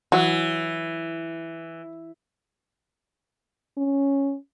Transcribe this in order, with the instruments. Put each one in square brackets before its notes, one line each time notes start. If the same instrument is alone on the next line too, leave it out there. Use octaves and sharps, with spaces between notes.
[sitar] E3 [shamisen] F#3
[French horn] C#4